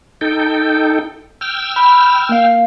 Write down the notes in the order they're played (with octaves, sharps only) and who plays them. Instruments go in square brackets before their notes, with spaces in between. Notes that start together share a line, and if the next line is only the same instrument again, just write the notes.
[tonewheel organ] D#4 A4 G5
G5 E6 F6
[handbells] B5
A#3 F5